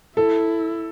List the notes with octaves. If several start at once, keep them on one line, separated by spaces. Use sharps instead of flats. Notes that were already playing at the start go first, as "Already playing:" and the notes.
E4 A4